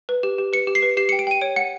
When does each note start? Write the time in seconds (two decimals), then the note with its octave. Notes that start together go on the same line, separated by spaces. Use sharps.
0.09 B4
0.23 G4
0.38 G4
0.53 B4 C#7
0.67 G4
0.75 C7
0.82 B4
0.97 G4 C7
1.09 C#7
1.12 G5
1.19 D7
1.27 G5 D#7
1.41 C#5 D7
1.56 F#5 C#7